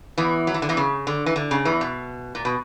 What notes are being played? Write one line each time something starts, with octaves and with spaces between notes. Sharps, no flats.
E2 E3
F#3
E3
D3
E2 E3
C#3
D3
E3
D3
C#3
E2 E3
B2
A#2
B2